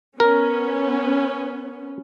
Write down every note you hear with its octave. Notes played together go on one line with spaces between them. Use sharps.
B3 C#4 A#4